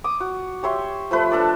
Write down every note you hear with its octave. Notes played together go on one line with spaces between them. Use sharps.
D6 D#6
F#4
G4 C#5 E5 C6
F3 A3 B4
D4 A4 D5